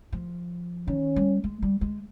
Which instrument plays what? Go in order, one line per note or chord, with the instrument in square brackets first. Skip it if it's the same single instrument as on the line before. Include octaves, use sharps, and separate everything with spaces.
[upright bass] F3
[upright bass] D#3 [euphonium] C#4
[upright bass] G3
G#3
G3
G#3